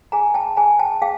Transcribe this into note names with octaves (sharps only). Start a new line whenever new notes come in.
G#4 G#5 A#5
G5 A5
G#4 G#5 A#5
G5 A5
G#4 F5 G5